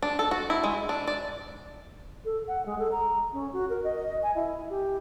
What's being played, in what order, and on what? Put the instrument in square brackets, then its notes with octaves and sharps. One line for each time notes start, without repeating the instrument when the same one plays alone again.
[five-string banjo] D4
A4
F#4
E4
G#3
D4
D5
[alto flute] A4
F#5
G#3
A4
A#5
C#4
F#4
A#4
D#5
G#5
E4
G4